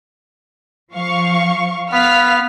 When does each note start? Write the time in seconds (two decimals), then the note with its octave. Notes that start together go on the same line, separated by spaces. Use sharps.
0.93 F3 F5 C#6
1.92 B3 F5 F6 B6